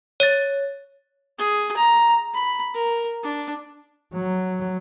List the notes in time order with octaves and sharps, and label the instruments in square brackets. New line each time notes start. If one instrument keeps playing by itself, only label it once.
[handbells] C#5 A6
[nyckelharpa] G#4
A#5
B5
A#4
D4
[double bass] F#3